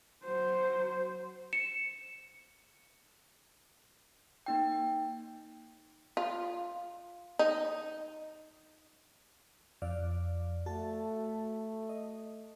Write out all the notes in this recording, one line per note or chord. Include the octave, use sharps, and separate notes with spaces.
F#3 C5
C#7 E7
A#3 D#4 G5
F4
D#4
F2 D5 F5
A3 F#4 A5
D#5